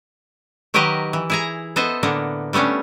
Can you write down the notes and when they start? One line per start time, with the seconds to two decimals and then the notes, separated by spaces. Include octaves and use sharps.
0.74 D#3 F#3 G4 A#4 B4 D#5
1.13 E3
1.30 E4 G#4 A#5
1.76 B3 A4 C5 D#5 E5
2.03 A2 D3 A#3 B3
2.53 G3 A3 B3 C#4 D4